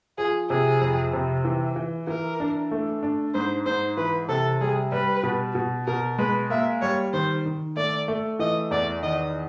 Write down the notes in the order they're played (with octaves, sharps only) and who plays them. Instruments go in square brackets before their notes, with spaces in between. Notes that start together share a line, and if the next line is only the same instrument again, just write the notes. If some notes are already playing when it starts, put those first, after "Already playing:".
[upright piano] F3 [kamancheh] G#4
[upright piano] C3 [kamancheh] G#4
[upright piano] F2
C3
E3
E3
[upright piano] E3 [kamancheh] A#4
[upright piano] D4
A3
D4
[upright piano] G#2 [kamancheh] C5
[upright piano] G#2 [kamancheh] C5
[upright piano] E3 [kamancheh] B4
[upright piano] C3 [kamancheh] A4
[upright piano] G3 [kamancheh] G#4
[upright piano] G3 [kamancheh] B4
[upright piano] B2
B2
[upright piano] B2 [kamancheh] A#4
[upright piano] G#3 [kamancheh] B4
[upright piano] A#3 [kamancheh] E5
[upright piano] G3 [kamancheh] C#5
[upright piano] D#3 [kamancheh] C5
[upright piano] D#3
[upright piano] A3 [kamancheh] D5
[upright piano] A3
[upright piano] E3 [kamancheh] D#5
[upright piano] E2 [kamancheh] D5
[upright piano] D#3 [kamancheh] D#5